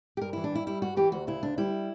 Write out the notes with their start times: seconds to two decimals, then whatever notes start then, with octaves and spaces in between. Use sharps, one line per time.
0.17 G4
0.21 G2 A#4
0.33 E3 E4
0.44 D4
0.51 G2 E4
0.66 G3 E4
0.82 G2 F#4
0.97 E3 G4
1.12 D2 F#4
1.27 C#3 E4
1.43 D2 D4
1.58 G3 E4